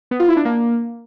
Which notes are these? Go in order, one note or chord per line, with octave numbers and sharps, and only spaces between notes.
B3
F4
E4
D4
A#3